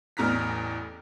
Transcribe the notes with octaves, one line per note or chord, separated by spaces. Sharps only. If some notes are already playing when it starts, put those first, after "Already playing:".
A1 E2 A2 A#5 F6 B6